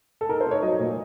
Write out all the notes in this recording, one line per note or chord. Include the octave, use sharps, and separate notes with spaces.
A4
D#4 A#4
C5
D#4 C#5
F#3 D#5
A#2 D#5